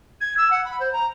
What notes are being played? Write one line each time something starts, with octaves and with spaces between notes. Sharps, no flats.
G#6
E6
F#5
B5
C5
A#5